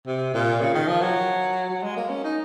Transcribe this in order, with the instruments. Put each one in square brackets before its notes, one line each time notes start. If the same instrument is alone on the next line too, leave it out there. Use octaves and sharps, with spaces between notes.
[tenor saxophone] C3
A#2
C#3
D#3
F3
F#3
F#3
G#3
A#3
C#4
D#4